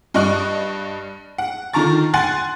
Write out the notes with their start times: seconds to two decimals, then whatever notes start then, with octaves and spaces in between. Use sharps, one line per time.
0.14 G2 D#5 C#6 F#6
1.38 F#5
1.73 D3 D#3 F4 A#5 C#6 A6
2.14 F#5 G#5 C6 F#6 A6